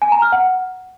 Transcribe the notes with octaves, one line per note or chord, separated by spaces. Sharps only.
G#5
A#5
F6
F#5